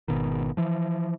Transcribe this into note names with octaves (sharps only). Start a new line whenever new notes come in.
G#1 B2 D#3
E3 F3